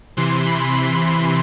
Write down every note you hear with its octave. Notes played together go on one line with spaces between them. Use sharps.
C3 E3 C6
B5
B5